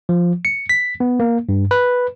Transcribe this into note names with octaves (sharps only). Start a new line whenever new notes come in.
F3
C#7
B6
B3
A#3
G2
B4